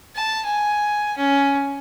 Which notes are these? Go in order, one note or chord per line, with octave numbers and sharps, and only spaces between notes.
A5
G#5
C#4